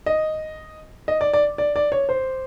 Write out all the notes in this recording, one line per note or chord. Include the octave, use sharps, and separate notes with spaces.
D#5
D#5
D5
D5
D5
D5
C#5
C5